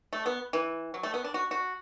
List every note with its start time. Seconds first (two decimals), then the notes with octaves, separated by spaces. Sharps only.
0.13 A3
0.26 B3
0.53 E3
0.94 F#3
1.03 A3
1.14 B3
1.24 D4
1.34 F#4
1.51 F#4